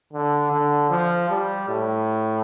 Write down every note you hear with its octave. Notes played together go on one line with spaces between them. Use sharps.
D3
D3
F3
G3
A2